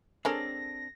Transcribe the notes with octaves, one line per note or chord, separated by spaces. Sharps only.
G#3 C4 D4 A4 A#4 C#5 A#6